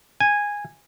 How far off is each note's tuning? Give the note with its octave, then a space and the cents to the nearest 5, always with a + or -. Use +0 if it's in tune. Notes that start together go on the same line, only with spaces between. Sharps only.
G#5 -10